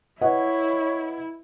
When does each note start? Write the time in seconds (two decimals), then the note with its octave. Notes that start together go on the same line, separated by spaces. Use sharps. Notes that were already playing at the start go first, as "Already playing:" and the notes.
0.21 E4 B4 C#5 D#5 F#5